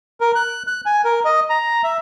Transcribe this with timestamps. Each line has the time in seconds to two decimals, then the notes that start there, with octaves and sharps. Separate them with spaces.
0.21 A#4
0.35 F#6
0.67 F#6
0.86 G#5
1.05 A#4
1.25 D#5
1.50 A#5
1.84 E5